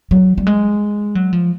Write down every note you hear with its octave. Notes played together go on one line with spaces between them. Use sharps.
F#3
G3
G#3
F#3
F3